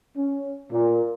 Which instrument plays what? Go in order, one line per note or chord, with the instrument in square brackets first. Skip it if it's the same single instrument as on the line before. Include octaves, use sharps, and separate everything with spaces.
[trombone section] C#4
A#2